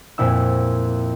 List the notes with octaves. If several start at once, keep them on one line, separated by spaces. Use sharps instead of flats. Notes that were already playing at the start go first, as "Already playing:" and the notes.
F2 A#2 E4 E6